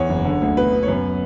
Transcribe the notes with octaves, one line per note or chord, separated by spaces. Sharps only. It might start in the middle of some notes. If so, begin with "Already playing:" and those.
Already playing: E2 C#5
F#1
D3
D2
B2 B4
B3
C#5
F#2 B4